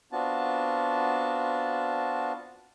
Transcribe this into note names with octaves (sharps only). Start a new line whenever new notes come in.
B3 C4 D4 F4 F#4 A5